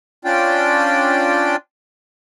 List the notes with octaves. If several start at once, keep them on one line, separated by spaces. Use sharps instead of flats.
C#4 D4 F4 D5 G5